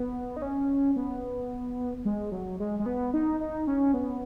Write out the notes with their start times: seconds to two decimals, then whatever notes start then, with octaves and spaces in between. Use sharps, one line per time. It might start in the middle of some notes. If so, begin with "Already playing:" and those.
Already playing: B3
0.36 D#4
0.42 C#4
0.96 B3
2.05 G#3
2.32 F#3
2.60 G#3
2.79 G#3
2.86 B3
3.14 D#4
3.40 D#4
3.67 C#4
3.94 B3